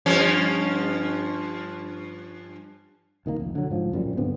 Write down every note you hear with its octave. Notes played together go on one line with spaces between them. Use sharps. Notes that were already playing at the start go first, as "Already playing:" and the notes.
G2 F3 C#4
C2 D#3 F3 A#3
F1
D3 F#3
G#2 F3
D1 F#2 A#2 G3
G2 D3 B3 C4